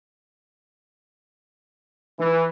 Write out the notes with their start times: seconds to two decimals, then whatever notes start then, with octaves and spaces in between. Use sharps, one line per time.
2.19 E3